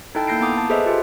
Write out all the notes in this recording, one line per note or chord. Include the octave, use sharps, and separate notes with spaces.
D#4 E4 A4 G5 A5
A#3 E4 G6 A#6 C7 D7
B3 A#5 D6 D#6
A5
G#4 A4 B4 C5 D#5 E5
F4 G4 A4